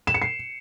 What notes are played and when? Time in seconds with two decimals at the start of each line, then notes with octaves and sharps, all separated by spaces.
0.07 E7
0.14 C#7
0.22 C7